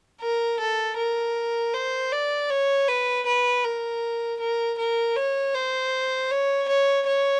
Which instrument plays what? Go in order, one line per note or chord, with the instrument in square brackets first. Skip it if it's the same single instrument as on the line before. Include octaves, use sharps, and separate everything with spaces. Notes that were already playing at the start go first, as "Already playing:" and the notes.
[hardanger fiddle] A#4
A4
A#4
C5
D5
C#5
B4
B4
A#4
A#4
A#4
C#5
C5
C#5
C#5
C#5